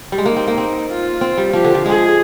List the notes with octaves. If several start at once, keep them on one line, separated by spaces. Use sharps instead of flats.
G3
G#3
A#3 D#4
C4
A#3
C4
F4
C4
G3
F3 G4
D3
F3
G#3 G#4